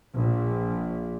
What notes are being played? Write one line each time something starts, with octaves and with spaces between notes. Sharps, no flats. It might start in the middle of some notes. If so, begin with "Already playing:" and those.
A#1